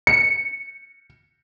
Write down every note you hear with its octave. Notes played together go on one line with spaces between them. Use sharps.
C#7